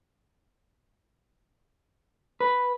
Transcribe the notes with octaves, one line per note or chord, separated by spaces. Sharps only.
B4